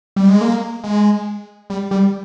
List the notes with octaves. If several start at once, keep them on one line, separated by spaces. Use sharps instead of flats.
G3
G#3
A#3
G#3
G3
G3